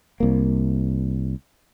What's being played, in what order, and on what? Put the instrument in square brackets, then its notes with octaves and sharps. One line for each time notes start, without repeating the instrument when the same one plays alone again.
[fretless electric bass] C2 A#3